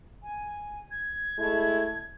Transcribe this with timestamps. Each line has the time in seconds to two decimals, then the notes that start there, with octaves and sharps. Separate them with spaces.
0.23 G#5
0.91 G#6
1.38 G#3 A3 E4